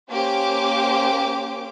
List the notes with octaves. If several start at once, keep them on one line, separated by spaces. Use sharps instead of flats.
A#3 C#4 G4 C5 D6